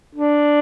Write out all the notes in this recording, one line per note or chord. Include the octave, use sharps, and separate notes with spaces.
D4